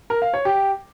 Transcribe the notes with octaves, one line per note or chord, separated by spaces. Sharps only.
A#4
F5
C#5
G4